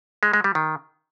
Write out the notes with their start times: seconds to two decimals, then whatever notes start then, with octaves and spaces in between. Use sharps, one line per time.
0.23 G#3
0.33 G#3
0.44 G3
0.55 D#3